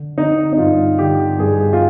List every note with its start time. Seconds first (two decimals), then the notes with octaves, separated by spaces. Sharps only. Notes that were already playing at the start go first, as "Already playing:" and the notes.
Already playing: D3
0.17 D3 D#4
0.53 D#4
0.58 G2 F4
0.99 D3 G4
1.39 G2 G#4
1.73 F4